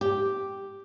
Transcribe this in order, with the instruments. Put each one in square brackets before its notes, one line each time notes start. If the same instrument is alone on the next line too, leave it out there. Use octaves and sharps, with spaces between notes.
[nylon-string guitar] G4